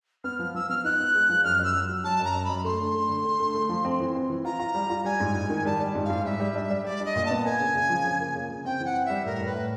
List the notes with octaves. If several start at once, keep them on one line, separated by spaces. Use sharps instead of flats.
B3 F6
F3 F6
F3 E6
B3 F6
D#4 F#6
B3
G#3
F3
F#2 F6
F#2 E6
F#3
F#3
F#3 A5
F#2 A#5
F#2
B5
F#2
A3 C6
D3
A3
D3
D3
A3
A3
F3
C4
E3
C4
E3
F4 A#5
F4
G3
F4
G3 G#5
G#2
G#2
D#3
G3 A5
G3
G#2
F5
G#2
G3 E5
G3
D4
G3
G3 D5
D4 D#5
A#2
A5
B3
A#3 G#5
C#3
C#3
F3
C#3
A#3
C#3
C#3
C4 G5
E3 F#5
E3
G3 E5
A2 A#4
A2 B4
A2